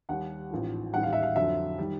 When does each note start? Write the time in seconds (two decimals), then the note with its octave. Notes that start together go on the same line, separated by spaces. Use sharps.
0.09 D#2 D#3 G3 F#5
0.51 A1 G#2 F3
0.93 A1 G#2 D#3 G3 F#5
1.03 F5
1.13 E5
1.23 F5
1.36 F2 D3 F#3 E5
1.78 D#3 G3